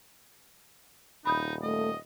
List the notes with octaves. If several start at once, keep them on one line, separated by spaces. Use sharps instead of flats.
D#1 D#4 B5 D#6 G6
A3 D#5